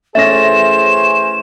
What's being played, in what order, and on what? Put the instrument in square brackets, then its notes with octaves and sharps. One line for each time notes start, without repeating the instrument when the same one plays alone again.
[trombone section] E3 G#4 C5 [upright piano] A3 C#4 A#6 [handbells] E5 [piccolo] E7